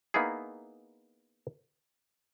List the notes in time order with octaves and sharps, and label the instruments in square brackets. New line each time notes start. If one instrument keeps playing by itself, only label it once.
[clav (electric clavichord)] A#3 B3 D#4 E4 G#4